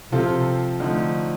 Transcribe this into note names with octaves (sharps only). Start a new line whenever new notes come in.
C3 F3 C4 F4 A4
D3 F3 A3 D#4